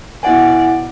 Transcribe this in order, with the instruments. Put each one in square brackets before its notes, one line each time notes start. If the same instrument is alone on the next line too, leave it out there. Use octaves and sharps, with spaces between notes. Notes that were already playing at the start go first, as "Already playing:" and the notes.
[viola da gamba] B2 D5 [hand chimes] E4 F#5 G#5